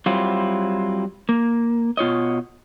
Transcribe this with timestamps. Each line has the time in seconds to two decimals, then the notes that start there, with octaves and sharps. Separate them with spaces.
0.06 F#3 G3 C4 E4 F4
1.29 A#3
1.97 B2 F4 C#5 D#5